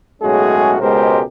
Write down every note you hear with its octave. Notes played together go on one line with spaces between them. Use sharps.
B1 A2 G#3 C#4 F#4 G#4
C#2 B2 G#3 G4 A#4 C5